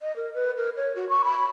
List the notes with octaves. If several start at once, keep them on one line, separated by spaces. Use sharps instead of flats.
D#5
A#4
B4
A#4
C#5
F#4
C#6
B5